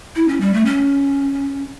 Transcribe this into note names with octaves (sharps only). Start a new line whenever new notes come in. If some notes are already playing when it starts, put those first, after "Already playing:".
E4
C#4
G3
A3
C#4